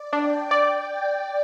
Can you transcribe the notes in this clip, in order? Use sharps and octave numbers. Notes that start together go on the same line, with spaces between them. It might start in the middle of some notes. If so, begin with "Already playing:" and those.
Already playing: D5
D4 G5
D5 G5